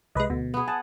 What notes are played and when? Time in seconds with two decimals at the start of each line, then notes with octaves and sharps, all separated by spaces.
0.15 C2 G#3 B4 D#5
0.30 D2 B2
0.54 B3 G#4
0.68 F#5 G#5 A5